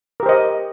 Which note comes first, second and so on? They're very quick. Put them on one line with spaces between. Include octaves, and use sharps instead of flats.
A#4 G4 C5 D#5